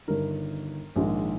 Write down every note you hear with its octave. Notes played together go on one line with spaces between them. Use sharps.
G1 G2 D#3 A#4
A#1 G#2 D#3